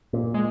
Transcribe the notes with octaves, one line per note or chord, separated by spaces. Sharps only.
A#2
G#3